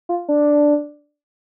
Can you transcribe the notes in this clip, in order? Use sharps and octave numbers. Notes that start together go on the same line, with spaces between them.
F4
D4